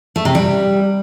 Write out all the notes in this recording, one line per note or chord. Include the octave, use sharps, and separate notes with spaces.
A3
C3
G3